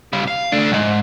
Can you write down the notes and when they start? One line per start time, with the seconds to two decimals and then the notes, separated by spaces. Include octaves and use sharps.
0.13 C#3 G3
0.28 F5
0.52 A3 D4
0.72 C2 G#2